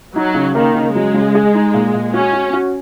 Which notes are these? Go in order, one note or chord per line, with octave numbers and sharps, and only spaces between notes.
F#3 D#4
C#3
D#3 A#3
C#3
F#3 G#3
C#3
G#4
D#4
A#2
A#2
C#4 F#4
F#4
F#4